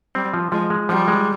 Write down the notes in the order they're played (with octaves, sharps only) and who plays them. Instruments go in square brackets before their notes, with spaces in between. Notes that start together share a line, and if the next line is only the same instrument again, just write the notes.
[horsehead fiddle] G3 [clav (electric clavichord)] C4
[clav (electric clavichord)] F3
[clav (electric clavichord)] F3 [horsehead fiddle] G#3
[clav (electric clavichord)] G#3
[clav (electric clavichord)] F3 [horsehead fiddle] G3
[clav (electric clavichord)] G#3